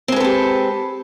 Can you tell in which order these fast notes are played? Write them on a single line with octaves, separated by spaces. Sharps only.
C4 G#3 B4 A4 G4